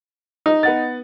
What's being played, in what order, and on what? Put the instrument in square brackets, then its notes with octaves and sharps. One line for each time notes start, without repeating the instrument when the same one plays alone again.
[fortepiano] D#4
[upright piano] B3 F#5 A6